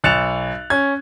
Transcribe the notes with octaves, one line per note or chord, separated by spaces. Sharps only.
B1 F#6 A6 C#7 E7 F7
C#4 G#6